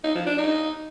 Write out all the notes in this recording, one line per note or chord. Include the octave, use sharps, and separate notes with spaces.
D#4
F3
D4
D#4